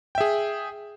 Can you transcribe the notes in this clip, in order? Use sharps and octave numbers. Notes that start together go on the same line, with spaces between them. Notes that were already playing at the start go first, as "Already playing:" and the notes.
G#4 E5 G5